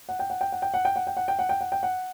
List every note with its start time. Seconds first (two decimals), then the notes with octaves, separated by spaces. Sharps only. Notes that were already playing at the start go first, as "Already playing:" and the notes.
0.09 F#5
0.19 G5
0.30 F#5
0.41 G5
0.52 F#5
0.62 G5
0.74 F#5
0.85 G5
0.96 F#5
1.07 G5
1.17 F#5
1.28 G5
1.39 F#5
1.49 G5
1.61 F#5
1.72 G5
1.83 F#5